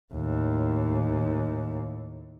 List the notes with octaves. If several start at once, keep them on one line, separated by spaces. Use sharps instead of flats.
D#2 A2